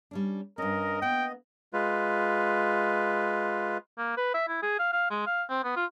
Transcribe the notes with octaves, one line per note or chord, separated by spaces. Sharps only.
G3 C#4 D4
G2 C#4 A#4 D#5
A#3 B3 G5
G#3 F4 B4
A#3
B4
E5
E4
G#4
F5
F5
G#3
F5
C4
B3
F4